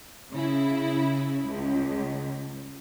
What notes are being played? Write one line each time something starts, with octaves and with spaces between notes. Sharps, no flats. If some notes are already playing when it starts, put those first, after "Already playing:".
C#3 E4
C#2